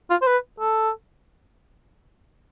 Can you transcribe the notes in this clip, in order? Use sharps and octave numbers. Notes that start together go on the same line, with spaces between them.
F4
C5
B4
A4